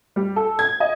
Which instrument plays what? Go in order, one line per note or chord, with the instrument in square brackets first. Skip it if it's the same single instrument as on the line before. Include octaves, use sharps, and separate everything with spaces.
[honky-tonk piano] G3
A4
G#6
D#5